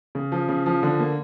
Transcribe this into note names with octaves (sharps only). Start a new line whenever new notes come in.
C#3
F3
C#3
F3
D3
A#3